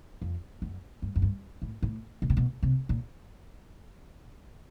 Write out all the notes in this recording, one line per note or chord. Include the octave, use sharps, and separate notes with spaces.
F2
F#2
G2
F#2
G2
A2
A2
B2
C3
B2
C3
A#2